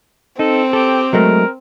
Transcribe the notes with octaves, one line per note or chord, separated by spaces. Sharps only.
C4 D#4 A4
G4 A4
F#3 G#3 A3 A#4